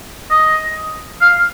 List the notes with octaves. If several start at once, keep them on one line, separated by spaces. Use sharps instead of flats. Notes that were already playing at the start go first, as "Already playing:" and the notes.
D#5
F5